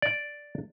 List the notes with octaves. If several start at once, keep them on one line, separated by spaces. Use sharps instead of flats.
D5